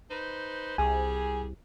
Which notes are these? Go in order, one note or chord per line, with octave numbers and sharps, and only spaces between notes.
D#4 B4 C5
C2 G3 G#4 G#5